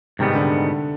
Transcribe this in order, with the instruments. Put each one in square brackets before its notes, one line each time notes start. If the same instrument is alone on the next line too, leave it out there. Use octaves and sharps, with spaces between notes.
[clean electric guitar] G#2 D#3 G3 B3 [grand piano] C3
[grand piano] D3